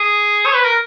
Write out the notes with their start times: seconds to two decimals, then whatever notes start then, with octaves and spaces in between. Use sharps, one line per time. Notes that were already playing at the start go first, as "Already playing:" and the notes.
Already playing: G#4
0.46 C#5
0.55 B4
0.65 A#4